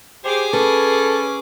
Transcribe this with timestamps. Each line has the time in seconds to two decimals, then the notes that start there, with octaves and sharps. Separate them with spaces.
0.25 G4 G#4 C5 D6
0.53 C#4 A4 B4